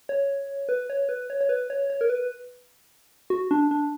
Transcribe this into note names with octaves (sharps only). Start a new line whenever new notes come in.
C#5
B4
C#5
B4
C#5
C#5
B4
C#5
C#5
A#4
B4
F#4
D4
D4